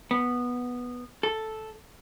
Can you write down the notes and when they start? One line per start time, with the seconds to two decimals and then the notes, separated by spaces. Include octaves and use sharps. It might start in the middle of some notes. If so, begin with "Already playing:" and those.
0.11 B3
1.23 A4